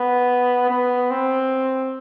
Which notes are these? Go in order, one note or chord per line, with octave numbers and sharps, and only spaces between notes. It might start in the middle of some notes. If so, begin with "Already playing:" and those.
Already playing: B3
B3
C4